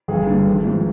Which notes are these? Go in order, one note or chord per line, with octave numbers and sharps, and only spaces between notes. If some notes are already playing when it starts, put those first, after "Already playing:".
G1 G#4
G2 D3
G#1
G#2 F3